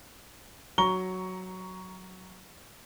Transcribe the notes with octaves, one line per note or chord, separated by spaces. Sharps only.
F#3 A#5 C#6 G7